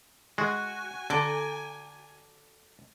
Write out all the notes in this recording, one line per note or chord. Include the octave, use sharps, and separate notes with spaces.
G#3 F#4 G#5
D3 A4 D5 A#5